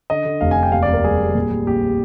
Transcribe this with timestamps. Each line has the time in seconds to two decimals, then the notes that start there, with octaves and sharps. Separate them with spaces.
0.10 D3 D#5
0.25 D3
0.41 F1 F5
0.51 G#5
0.57 D3
0.63 G5
0.72 D#2 F5
0.83 D5
0.89 D#2 A#4
1.04 G3 G#4
1.19 D#2
1.35 A#2
1.51 G3
1.67 A#1 G4